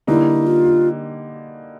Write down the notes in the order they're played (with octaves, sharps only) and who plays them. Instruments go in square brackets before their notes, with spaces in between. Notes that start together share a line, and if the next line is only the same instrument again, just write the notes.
[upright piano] D3 G3 A#3 D#4 [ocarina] E4
[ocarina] F4